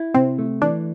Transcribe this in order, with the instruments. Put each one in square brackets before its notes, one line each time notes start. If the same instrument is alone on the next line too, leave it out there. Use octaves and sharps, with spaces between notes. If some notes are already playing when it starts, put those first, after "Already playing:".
Already playing: [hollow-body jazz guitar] E4
[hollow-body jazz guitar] C3 [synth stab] C4
[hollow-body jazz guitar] A3
[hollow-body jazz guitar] E3 [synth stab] D4